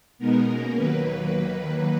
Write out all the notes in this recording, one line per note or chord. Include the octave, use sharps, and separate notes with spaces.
B2 G#3 B3 D#4 A#4
B2 A#3 C#4
D#2 D#3 F#3 A#3 B4